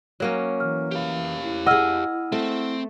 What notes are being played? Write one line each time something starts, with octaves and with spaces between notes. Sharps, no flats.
F#3 A#3 C#4
E3 F6
G4 F5
E4
G#4 D#5 F#5 E6 F6
A3 C4